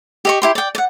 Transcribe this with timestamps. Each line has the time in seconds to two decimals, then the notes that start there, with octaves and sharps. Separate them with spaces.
0.25 G4 D#5 C#6
0.42 E4 G4 C6
0.55 D5 G5
0.75 D5 F#5